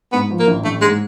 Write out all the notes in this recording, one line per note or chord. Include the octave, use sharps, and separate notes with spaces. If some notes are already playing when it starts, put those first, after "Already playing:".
G#2 B3
F3
A#3
A1
A1 A3
G#2 G#3